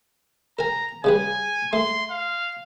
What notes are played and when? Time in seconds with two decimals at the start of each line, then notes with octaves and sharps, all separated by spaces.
0.59 A#4 G#5 A#5
1.04 C#3 G3 B4 G#5
1.73 A3 C6
2.11 F5